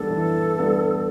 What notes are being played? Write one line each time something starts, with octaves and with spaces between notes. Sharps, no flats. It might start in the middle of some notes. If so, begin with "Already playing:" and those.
Already playing: E3 G3 B3 D4 A4
E3
G3 B3 D4